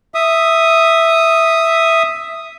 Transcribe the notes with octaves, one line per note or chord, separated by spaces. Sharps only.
E5 D#6